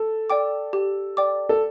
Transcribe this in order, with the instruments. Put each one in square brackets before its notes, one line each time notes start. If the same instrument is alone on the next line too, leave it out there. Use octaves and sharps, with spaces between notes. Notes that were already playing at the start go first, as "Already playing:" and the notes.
Already playing: [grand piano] A4
[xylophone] D5 G5 D6
G4
D5 G5 D6
[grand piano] A4